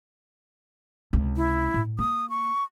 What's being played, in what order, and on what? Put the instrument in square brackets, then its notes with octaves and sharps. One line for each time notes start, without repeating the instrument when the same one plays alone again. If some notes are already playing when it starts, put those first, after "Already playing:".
[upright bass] C#2 C3
[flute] E4
[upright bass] A2
[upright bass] A#3 [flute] D#6
[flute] C#6